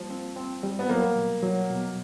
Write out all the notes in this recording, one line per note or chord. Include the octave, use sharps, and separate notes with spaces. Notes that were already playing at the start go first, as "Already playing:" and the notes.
Already playing: F3 G3 A#3
C4
C4
G3
B3
F#3 A#3
B2
F#3
B2